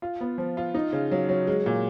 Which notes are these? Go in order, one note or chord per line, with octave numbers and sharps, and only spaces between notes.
F4
B3
F3
F4
D#4
C#3
F#3
F#3
G#3
A#2